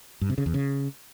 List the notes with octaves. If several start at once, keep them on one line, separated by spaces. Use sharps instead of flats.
G2
C3
C#3
E2
C#3